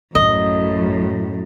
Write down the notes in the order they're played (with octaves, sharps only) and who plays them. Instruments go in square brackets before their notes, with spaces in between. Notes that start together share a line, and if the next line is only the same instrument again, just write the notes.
[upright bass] A1 [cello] F#2 A2 [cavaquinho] D#5